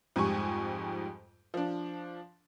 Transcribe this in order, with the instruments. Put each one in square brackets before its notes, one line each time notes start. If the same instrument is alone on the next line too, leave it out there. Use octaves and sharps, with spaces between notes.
[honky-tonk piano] F2 G#2 G3 G#5 C#6
F3 D4